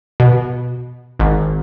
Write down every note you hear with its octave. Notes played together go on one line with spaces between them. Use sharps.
B2
G#1